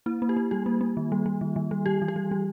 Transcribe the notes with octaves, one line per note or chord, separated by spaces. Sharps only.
A#3 E4
A#3
G4
A#3
G3 G4
A#3
A#3
D#3
G3
G3
D#3
D#3
G3
G3 G4
E3
G4
G3
G3